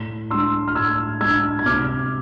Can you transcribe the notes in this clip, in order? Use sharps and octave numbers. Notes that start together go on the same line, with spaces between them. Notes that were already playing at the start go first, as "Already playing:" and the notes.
Already playing: A2
G#3 D4 C6 E6
F6
A2 E6 G#6
G#3 D4 E6 G#6
G#6
C3 D6 F6